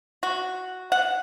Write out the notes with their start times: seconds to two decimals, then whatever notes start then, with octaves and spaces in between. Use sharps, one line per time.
0.23 F#4
0.92 F#5